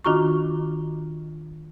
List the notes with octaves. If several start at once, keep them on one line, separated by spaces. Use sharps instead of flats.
D#3 D4 F4 F#4 A#5 C#6